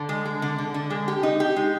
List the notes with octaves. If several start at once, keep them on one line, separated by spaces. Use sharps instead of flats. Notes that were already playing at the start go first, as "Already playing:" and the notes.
Already playing: D3
G#3
G#3
D3
D3
D3
G#3
G4
D#4
G4
G#3